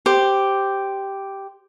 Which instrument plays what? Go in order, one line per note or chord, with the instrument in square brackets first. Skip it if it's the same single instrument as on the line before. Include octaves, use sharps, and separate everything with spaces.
[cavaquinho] G4 C5